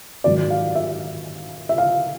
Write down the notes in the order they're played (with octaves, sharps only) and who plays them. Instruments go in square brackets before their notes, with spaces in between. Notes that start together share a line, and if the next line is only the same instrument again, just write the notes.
[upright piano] G#2 D#3 F#3 D5
F5
E5
E5
F5